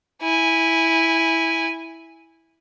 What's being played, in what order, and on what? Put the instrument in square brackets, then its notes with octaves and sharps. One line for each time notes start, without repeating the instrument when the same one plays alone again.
[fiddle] E4 G#5